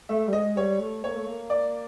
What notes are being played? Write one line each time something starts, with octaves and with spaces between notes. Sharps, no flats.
A3 E5
G3
G#3 D#5
G3 C#5
A3
A#3 C#5
A3
A#3
D5